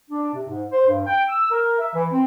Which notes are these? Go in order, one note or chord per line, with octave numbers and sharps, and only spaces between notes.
D4
C3
G#2
C5
G2
G5
E6
A#4
E5
E3
C4